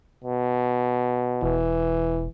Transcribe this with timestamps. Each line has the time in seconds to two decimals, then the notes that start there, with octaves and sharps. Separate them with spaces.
0.24 B2
1.43 E1 E3